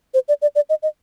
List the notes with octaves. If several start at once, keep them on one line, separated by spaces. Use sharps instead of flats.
C5
D5
D5
D5
D#5
D#5